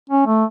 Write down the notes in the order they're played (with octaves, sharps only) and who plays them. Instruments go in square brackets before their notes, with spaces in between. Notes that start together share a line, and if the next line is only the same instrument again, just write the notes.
[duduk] C#4
A3